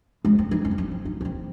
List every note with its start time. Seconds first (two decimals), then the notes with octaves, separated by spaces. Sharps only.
0.25 G#3
0.38 C4
0.51 D#4
0.65 C#4
0.71 C4
0.78 C#4
0.91 C4
1.05 D#4
1.21 C#4
1.25 C4